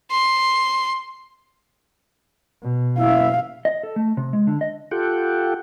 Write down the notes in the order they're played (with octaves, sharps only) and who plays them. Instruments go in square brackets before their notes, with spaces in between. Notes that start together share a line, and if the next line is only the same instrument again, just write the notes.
[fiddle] C6
[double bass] B2
[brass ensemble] F#1 E4 E5 [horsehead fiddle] F5
[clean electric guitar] D#5
A4
A3
C3
G#3
D3
D#5
[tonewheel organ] F4 G4 A4 F#5 G5